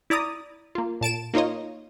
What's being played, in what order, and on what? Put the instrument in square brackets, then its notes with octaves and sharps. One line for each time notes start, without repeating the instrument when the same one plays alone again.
[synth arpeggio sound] E4 D5 A#5 D#6
A#3 F4
A#2 A5 D7 E7
A#3 D#4 F4 C#5 D#5